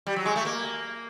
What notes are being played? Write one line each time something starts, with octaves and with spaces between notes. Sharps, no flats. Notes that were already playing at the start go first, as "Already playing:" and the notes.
G3
F#3
G#3
A3
A#3